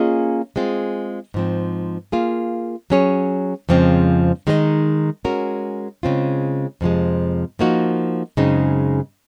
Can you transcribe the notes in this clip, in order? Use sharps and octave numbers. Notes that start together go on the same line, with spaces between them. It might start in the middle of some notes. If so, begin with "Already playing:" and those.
Already playing: A#3 C#4 F4 G#4 D#5
G#3 C4 F4 G#4
G#2 F3 C4
A#3 F4 G#4
F#3 C#4 G#4 C#5
F2 C#3 F3 G#3 C4
D#3 G#3 D#4 A#4 D#5
G#3 C#4 F#4 A#4
C#3 G#3 C4 F4
F2 C3 F3 G#3
F3 A#3 D#4 F#4
F#2 C#3 G#3 C4 D#4